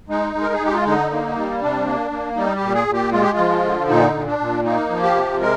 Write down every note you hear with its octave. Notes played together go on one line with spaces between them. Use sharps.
G#3 D#4
G#3
A#4
G#4
G#3
G4
F4
D3 D#4
A#3
G3
C3 D4
A#3
A#3
G3 D#4
G4
A#2
G#4
A#2
G4
G#3 F4
G4
F4
F3
D3
A#2 D#4
A#2
D4
A#2
A#3 D#4
F3
G4
C3
G#3 A#4